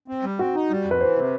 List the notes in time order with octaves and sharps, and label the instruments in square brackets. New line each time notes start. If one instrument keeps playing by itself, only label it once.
[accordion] C4
G3
[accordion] C4 [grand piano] F#4
[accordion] D#4
G3
F2
[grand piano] B4
[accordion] E3 [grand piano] C5
[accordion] C3